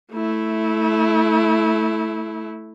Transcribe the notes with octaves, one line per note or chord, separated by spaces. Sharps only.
A3 E4